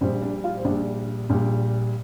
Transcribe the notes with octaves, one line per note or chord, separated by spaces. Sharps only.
A#1 A#2 G3 C4 C5
D4 D5
F4 F5
C5
A#1 A#2 G3 D4 D5
A#1 A#2 G3